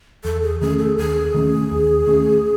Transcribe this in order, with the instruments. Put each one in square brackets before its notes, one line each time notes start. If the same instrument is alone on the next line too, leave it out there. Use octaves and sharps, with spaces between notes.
[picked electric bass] E2 [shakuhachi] A4
[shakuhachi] G#4
[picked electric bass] D#3 A3 C#4 [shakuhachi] G#4
[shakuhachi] A4
[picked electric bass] D#2 [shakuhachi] G#4
[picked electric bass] D#3 A3 C#4
D#2
D#3 A3 C#4